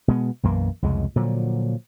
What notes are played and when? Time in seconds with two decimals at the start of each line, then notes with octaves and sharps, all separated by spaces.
0.08 B2 G#3 B3
0.43 B1 F#2 E3 A#3
0.82 C2 F2 C#3 G#3
1.16 A#2 D3 F3 F#3